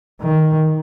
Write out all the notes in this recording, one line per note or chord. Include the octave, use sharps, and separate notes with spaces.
D#3